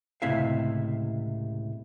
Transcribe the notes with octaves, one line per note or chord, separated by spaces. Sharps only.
C#2 A2 C3 E4 E5 F5